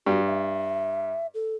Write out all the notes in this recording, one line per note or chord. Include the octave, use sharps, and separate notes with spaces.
G2 F#4
E5
A4